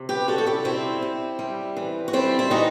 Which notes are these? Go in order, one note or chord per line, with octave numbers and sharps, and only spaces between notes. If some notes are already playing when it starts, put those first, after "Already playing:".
Already playing: C3
G4 B4
G3 F#4 A4
A4
E4 G4
C3 C4 E4
C3
G3
E3
F#4
G3 C4 E4
E4
E3 D#4 F#4